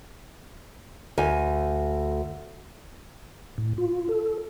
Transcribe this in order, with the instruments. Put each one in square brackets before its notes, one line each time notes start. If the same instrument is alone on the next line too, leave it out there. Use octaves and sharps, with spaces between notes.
[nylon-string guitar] D2 G#5
[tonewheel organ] A2
F4
A4